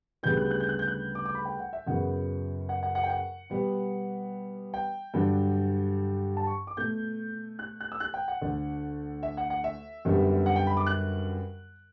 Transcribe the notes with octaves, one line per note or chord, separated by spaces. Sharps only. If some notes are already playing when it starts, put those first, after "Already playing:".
D2 C#3 G3 B3 G6
F#6
F#6
G6
F#6
G6
F#6
D6
D6
B5
G5
F#5
E5
F#2 C#3 F#3 B3 F#5
F#5
F#5
F#5
G5
F#5
B2 G3 B3
G5
G2 D3 F#3
A5
C#6
D6
B2 A3 G6
F#6
F#6
E6
F#6
G5
F#5
D2 D3 A3
E5
F#5
F#5
E5
F#2 D3 G3 B3
F#5
G5
B5
D6
F#6